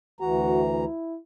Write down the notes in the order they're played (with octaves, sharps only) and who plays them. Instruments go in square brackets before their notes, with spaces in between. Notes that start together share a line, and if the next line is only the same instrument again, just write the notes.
[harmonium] D2 E3 A#5 [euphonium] F#4
[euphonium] E4